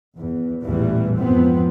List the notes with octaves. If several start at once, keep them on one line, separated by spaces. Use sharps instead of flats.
E2
A1 E2 A#2 E3 G3
F2 G#2 F3 B3 C4